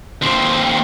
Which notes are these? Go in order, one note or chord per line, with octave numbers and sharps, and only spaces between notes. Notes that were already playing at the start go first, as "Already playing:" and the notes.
D#2 C4